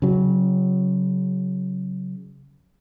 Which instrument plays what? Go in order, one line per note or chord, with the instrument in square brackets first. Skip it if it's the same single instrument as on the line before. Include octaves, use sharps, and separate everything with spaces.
[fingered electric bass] C#3 F#3